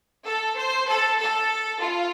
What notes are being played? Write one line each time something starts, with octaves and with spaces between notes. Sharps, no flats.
A4
C5
A4
A4
F4